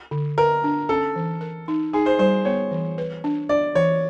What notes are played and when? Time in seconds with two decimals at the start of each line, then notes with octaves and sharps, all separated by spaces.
0.11 D3
0.38 A#4 B4
0.64 D4
0.89 C#4 A4
1.16 E3
1.41 A#4
1.68 D#4
1.93 D#4 G#4
2.06 C5
2.19 G3 C5
2.45 B3 C#5
2.71 E3
2.98 B4
3.24 D4
3.49 D4 D5
3.75 E3 C#5